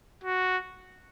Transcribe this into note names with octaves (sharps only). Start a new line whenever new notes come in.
F#4